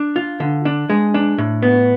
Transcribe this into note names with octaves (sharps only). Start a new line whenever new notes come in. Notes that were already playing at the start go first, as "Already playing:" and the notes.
Already playing: D4
F4
D3
D4
G#3
D4
A2
B3